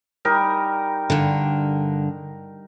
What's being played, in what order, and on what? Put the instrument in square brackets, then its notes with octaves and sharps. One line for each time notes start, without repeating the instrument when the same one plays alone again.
[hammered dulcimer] G3 D#4 A#4
[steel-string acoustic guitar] G2 D3